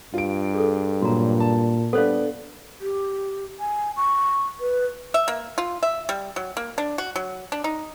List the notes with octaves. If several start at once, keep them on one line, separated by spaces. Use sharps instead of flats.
G2 F4 D7
G#4 A4
A#2 F#3 F#4 A#5
A5
G3 B3 D4 A4 C5 F5
G4
G#5
C#6
B4
E5
A#3
F4
E5
G3
F#3
A#3
D4
F#4
F#3
D4
D#4